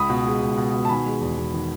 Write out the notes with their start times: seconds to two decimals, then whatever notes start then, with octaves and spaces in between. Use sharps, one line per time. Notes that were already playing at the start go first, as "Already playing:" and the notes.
Already playing: C#2 B5 D#6
0.10 B2
0.25 G#3
0.42 C#2
0.57 B2
0.74 B2
0.85 A5
0.89 D#3 G#5 B5
1.06 G#3
1.21 E2
1.37 E2
1.54 D#3